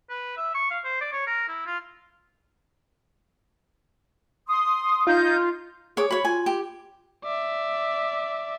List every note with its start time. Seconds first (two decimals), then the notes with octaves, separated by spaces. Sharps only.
0.10 B4
0.37 E5
0.55 C#6
0.70 F5
0.84 C5
1.01 D5
1.12 C#5
1.27 A#4
1.48 E4
1.66 F4
4.47 C6 D#6
5.07 D#4 F4 G6
5.97 G#4 C#5 D6
6.11 F#4 C#5 B5
6.25 F4 G#5
6.46 G4
7.24 D5 E5